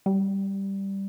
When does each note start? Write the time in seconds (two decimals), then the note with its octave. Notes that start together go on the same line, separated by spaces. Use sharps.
0.06 G3